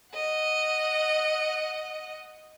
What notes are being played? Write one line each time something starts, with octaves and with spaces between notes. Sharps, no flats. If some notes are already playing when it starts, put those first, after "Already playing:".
D#5 F#5